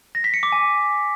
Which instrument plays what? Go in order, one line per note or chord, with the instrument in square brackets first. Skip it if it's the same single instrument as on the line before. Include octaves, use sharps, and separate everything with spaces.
[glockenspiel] A#6
B6
C#7
D6
G#5